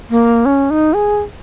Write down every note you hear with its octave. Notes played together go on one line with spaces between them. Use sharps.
A#3
C#4
D#4
G#4